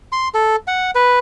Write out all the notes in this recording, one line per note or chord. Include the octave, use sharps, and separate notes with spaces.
C6
A4
F#5
B4